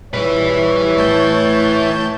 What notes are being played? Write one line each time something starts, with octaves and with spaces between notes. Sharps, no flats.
A#1 G3 E4 B4 C#5
A2 A5 G6